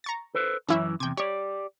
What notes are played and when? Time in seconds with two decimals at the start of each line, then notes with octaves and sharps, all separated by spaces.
0.04 A#5 C#6 A6
0.35 A4 B4 C5
0.69 F#2 E3 C#4 E4 E5
1.00 E2 C3 G5 G#6
1.17 G4 C#5 D5